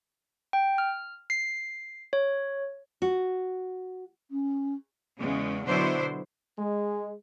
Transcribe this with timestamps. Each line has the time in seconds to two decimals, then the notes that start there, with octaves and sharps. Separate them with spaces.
0.53 G5
0.78 F6
1.30 C7
2.13 C#5
3.02 F#4
4.31 C#4
5.19 E2 C#3 G#3
5.66 B2 D3 F#3 D4 E4 C5
6.58 G#3